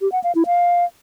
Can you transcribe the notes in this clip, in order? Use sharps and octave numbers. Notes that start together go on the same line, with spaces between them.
G4
F#5
F5
E4
F5